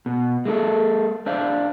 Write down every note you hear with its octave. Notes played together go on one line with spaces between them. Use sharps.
B2
G#3 A#3 E4 A4
D4 C5 D5 E5 F5